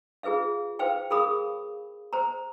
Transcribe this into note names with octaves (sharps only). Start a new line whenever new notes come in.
F4 G#4 B4 E5 F5
B4 C5 F5 G5
G#4 A#4 F5 B5 D#6
C5 A#5